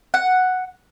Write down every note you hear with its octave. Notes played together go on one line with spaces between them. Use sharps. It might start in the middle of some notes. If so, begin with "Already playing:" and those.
F#5